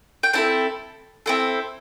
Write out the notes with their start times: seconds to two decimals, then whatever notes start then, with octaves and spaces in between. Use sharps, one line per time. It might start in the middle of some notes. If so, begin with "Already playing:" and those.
0.23 G5
0.33 C4 E4 A4 A5
1.26 C4 E4 A4